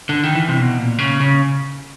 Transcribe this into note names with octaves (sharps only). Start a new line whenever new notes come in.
D3
D#3
E3
C3
B2
A#2
C#3
C#3